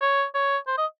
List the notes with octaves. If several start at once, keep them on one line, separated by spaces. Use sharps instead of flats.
C#5
C#5
C5
D#5